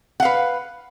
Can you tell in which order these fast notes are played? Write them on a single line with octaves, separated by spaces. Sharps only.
F#5 F5 B4